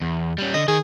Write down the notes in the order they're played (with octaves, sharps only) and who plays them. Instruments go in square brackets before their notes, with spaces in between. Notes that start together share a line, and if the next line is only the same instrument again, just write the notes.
[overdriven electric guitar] E2
G3 C#4
[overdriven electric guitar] D3 [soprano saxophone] D#5
[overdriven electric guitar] D#3 [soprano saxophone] G#4